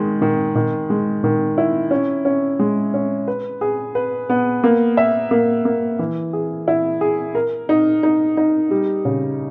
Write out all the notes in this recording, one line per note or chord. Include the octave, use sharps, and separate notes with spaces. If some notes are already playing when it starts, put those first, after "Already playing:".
Already playing: D#3 G#3
D#3
D#3
G#3
D#3
E4
C#4
C#4
G#3
C#4
B4
G#4
B4
B3
A#3
E5
A#3
A#3
E3
G#4
E4
G#4
A#4
D#4
D#4
D#4
G3
C#3